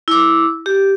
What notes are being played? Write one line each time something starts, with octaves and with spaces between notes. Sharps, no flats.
E4 D6
G4